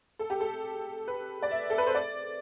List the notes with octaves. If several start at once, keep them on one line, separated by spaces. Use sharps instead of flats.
A4
G4
A4
B4
D5
E5
A4
B4
C5
D5